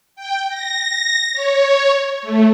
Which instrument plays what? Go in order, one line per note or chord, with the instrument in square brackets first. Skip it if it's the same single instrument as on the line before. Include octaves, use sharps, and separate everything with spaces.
[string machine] G5
A#6
C#5
A3